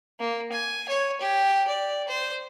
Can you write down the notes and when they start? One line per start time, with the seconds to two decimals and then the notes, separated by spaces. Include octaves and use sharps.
0.19 A#3
0.52 G#5
0.88 C#5
1.21 G4
1.68 D5
2.08 C5